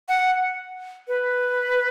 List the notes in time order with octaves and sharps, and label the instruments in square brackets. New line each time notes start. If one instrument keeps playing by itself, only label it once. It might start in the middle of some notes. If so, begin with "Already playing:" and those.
[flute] F#5
B4